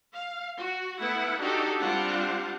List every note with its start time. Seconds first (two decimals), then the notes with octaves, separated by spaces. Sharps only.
0.13 F5
0.58 F#4
0.98 A3 B3 E4 F#5
1.39 D4 D#4 F#4 G4 A4
1.80 G3 C4 D4 F4 F#5